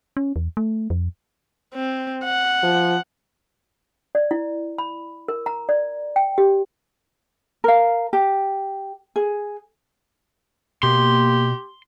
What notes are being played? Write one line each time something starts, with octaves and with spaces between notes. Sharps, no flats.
C#4
E2
A3
F2
C4
F#5
F3
D5
E4
B5
A#4
A#5
D5
G5
G4
A#4 F5
G4
G#4
B2 A#3 G4 C6